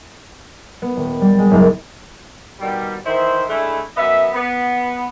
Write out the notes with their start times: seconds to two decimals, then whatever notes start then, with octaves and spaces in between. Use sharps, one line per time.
0.82 B3
0.97 D#1
1.21 G3
1.39 G#3
1.51 F#1
2.60 B2 D#3 G3
3.05 D#3 E3 E4 C5
3.48 G#3 A3 D4 E4
3.96 F#2 B3 D#5 E5
4.34 B3